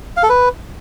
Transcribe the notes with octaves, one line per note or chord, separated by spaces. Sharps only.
F5
A4
B4